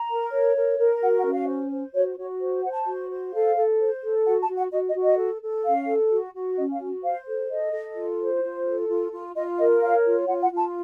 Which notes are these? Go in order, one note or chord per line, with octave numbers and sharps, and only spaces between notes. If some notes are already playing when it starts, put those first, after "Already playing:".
Already playing: A#5
A#4
C#5
A#4
A#4
F#4 F#5
F#5
C#4
F5
C5
C5
F#4 C#5
F#4 C#5
C5
C5 F#5
A5
F#4
C5
A4 F5
A4
C5
A4
F#4 F#5
A5
F#4
F#5
F#4 D#5
D#5
F#4
D#5
A4
A4
C#4 F5
A4
F#4
F#4
C#4 D#5
F5
F#4
C5 F5
A4
A4 D#5
A4
F4
C5
F4
A4
F4
F4
F4 D#5
A#4 D#5
C#5 F5
F4
F4 F#5
F#5
F4
A5